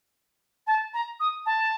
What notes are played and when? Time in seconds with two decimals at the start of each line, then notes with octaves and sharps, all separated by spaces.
0.67 A5
0.94 A#5
1.20 D#6
1.46 A5